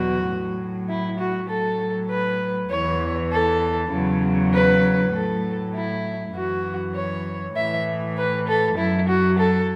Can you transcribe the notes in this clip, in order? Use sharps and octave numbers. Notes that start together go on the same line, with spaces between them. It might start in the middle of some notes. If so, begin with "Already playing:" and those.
Already playing: E2 B2 F#3 F#4
A2 F#3
E4
F#4
A2 F#3 A4
B4
E2 E3 C#5
A4
E2 C#3 F#3
B4
A2 F#3 A4
E4
F#2 E3 F#4
C#5
A2 E3 E5
B4
A4
F#2 F#3 E4
F#4
A4